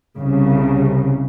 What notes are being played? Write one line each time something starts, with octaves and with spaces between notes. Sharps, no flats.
C2 C#3